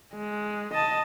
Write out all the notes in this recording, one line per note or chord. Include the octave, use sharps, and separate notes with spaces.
G#3
D#5 A5